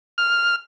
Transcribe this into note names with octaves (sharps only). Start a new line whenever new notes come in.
F6